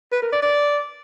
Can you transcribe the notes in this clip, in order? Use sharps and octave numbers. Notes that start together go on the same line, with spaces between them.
B4
A#4
D5
D5